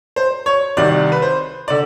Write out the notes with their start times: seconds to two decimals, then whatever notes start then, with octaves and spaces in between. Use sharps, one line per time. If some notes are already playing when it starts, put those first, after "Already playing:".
0.16 C5
0.46 C#5
0.77 C2 C3 D#3 D5
1.12 B4
1.22 C5
1.68 D3 D5